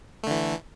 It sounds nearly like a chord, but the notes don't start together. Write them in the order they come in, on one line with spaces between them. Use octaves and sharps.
A3 D3 E3